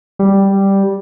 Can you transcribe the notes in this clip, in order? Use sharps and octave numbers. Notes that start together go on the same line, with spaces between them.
G3